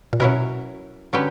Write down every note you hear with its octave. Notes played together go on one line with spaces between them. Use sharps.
A#2
B2 F#3 C#4 E4 A#4
D3 F#3 C#4 G4 B4